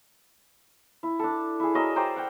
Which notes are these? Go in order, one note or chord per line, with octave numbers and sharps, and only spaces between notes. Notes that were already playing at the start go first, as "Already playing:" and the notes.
E4
D4 A4
E4 G#4
F#3 A#4 D#5 E5
C5 D5 G5 A#5
F#5 G5